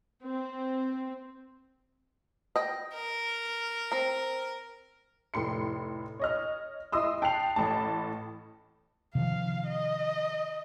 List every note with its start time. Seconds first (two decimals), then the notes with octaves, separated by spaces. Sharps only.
0.22 C4
2.56 D#5 G5
2.95 A#4
3.92 C4 A#5
5.34 F1 A2 C6 C#7
6.20 C#5 D#5 F6
6.92 E4 D#5 C6 D#6 E6
7.22 G5 A5 F#6 C7 F7
7.56 A1 A2 A5
9.15 C3 D#3 F3 F5
9.66 D#5